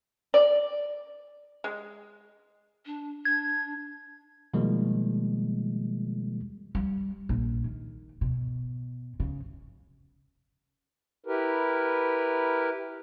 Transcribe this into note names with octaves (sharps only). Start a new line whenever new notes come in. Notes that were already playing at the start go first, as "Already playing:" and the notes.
D5
G#3
D4
D4 G#6
B2 D#3 F3 G3 G#3 A#3
G3
A#1
D#3
B2
C#3
E4 G4 A#4 B4